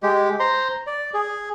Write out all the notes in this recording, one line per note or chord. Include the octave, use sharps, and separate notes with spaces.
G#3 G4
C5 A#5 C6
D5
G#4